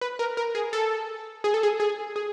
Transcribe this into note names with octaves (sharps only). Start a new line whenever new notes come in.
B4
A#4
A#4
G#4
A4
G#4
A4
G#4
G#4
G#4